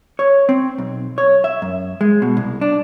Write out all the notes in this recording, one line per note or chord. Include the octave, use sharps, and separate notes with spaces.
C#5
C4
B1
C#5
E5
F#2
G#3
B2
C2
D4